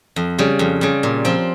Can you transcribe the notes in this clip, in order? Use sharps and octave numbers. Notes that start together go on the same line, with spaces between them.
F2
C#3 G3
F2
C#3 G3
A#2
F3 C4